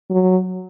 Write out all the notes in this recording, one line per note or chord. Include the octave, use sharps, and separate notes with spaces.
F#3